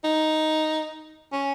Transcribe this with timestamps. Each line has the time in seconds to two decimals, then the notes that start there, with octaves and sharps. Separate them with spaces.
0.04 D#4
1.32 C#4